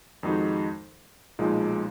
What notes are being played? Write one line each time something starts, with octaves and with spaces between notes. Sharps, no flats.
F2 D#3 G#3 D#4 F#4
B1 A#2 F3 G#3 D#4